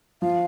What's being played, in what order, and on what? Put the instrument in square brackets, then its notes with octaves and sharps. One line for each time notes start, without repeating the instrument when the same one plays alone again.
[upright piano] F3 [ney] F5